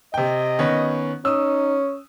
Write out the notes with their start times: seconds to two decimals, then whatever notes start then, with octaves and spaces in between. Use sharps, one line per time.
0.14 C3 D#5 G5
0.59 D#3 B3 C#4
1.25 C#4 D#4 D#6 E6